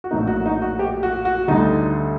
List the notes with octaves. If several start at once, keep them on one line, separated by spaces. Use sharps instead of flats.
F#4
A#1 A2 F#3 A#3 D#4
F#4
D#4
F#4
G4
F#4
F#4
D2 D3 G3 D#4